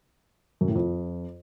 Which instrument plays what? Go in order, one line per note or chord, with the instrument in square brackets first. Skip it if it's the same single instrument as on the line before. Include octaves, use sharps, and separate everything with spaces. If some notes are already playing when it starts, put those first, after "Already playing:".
[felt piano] F#2
A2
F2